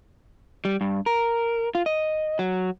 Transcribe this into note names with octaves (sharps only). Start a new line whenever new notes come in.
G3
G2
A#4
F4
D#5
F#3